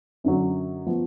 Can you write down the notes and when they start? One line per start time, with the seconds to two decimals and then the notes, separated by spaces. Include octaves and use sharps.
0.24 F#2 D3 F#3
0.86 F3 B3